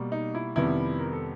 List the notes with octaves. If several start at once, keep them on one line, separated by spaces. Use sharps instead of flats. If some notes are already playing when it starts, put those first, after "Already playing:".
Already playing: B2 G3 A#3
D#4
E4
F2 C3 D#3 G3 B3 E4
A#4
A4